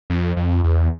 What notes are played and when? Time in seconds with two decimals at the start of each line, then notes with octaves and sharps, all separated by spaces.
0.10 F2
0.37 F2
0.64 E2